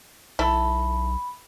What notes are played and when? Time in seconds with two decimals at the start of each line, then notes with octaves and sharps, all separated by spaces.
0.39 B1 E4 A4 B5